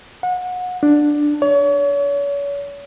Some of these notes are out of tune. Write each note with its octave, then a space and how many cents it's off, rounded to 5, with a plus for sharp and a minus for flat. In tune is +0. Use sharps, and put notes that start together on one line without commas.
F#5 -30
D4 +5
C#5 +40